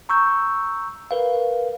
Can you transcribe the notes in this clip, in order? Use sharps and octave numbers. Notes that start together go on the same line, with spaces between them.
A#5 C#6 E6 G6
A#4 B4 F5